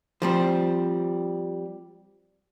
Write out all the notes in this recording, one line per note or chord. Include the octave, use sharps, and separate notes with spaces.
F3 G3 C4